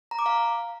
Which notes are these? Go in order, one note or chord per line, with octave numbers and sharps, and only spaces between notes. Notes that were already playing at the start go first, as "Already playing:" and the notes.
A#5
D6
F5